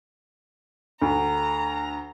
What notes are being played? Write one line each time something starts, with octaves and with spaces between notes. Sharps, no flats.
D2 A#5